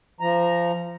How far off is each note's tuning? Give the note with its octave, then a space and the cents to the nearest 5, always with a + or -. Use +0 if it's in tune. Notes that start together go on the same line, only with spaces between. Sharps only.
F3 -20 A#5 +0